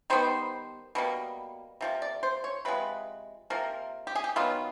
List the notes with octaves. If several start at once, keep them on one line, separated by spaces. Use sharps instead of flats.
D#3 G3 B3 C5
B2 G3 A#3
C3 F3 A#3
D5
C5
C#5
C3 F3 G#3 B4
C3 F3 A#3 A#4
G4
G#4
G4
D#3 F#3 B3 F4